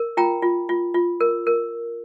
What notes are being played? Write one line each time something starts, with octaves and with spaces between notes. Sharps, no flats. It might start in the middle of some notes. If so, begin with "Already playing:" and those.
Already playing: A#4
F4 G5 A#5
F4
F4
F4
A#4
A#4